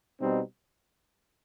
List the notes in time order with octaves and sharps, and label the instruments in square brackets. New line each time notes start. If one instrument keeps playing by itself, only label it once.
[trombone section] B2 G3 C4 D#4